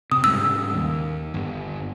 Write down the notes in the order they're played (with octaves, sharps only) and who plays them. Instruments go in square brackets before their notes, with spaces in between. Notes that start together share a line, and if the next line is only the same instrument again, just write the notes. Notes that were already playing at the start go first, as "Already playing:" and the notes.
[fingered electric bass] C3 [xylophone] D#6
[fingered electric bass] G#2 C#3 G3 [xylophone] E6
[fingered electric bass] D#2
G1